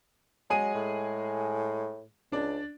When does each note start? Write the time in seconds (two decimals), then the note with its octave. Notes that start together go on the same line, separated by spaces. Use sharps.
0.50 F#3 G#3 G#4 D#7
0.75 A2
2.32 C#2 D4 D5